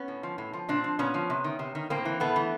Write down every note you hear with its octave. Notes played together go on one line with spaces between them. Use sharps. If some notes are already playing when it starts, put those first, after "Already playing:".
Already playing: B3 C#4
A2
F3
A2
F3
A#2 C4 D4
F3
A#2 B3 C#4
F3
C3
D#3
C3
D#3
A2 A#3 C4
E3
A2 A3 B3
E3